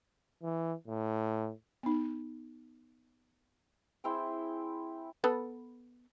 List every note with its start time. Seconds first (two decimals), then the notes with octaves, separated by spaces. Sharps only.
0.43 E3
0.87 A2
1.83 B3 D#4
4.04 C4 E4 G#4 G5
5.24 B3 A4 B4